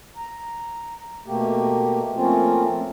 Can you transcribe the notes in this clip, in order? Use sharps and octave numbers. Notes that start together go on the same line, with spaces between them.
A#5
B2 A3 A#3 G4
F3 A3 A#3 C4 C#4 F4